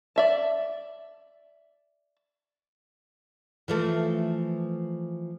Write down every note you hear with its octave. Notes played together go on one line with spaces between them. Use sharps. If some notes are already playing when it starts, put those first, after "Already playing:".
D5 E5 A5
E3 F3 A3